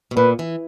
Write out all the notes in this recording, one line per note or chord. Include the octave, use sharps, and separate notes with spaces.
B2
A#2 B4
E3